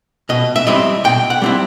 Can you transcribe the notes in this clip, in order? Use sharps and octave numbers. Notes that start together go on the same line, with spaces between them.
B2 D#5
E5
G3 C4 E4 D#5
B2 G5
F#5
G3 C4 E4